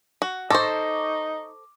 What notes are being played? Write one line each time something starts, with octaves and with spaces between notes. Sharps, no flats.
F#4
D#4 A4 C5 C#6 D6 A#6